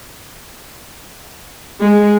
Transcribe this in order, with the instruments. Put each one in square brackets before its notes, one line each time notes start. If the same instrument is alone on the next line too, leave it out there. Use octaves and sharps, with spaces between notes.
[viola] G#3